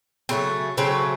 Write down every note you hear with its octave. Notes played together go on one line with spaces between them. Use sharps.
C#3 F#3 A3 C4
C#3 F#3 A3 C4